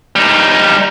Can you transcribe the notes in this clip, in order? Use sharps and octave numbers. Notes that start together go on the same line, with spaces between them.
G3 D#4